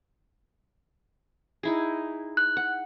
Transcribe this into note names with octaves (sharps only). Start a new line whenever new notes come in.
D#4 E4 G#4
F#6
F#5